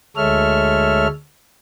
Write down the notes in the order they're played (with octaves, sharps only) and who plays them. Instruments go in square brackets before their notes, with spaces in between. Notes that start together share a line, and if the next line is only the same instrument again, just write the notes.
[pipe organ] D2 G#3 A4 C#5 E5 F6